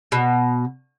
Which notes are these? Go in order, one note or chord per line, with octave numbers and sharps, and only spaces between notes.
B2